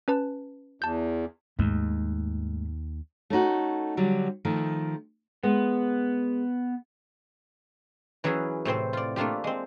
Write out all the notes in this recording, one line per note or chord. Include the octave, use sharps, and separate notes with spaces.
C#4 B4 A5
E2 A5 G6
D#2 G#2 A3
A3 C#4 D#4 F#4
D3 F#3 G3
D#3 F3 A3
G#3 B3
E3 F#3 C#4 E4 G#4
A2 C3 C4 C5
F4 D5
A3 A#3 D4 F4 G4
G#3 C4